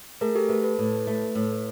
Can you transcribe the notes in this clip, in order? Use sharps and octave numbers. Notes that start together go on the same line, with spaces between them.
A3 G#4 A#4
G4 A4
A3 A4 B4
A4 B4
A2
A3
A2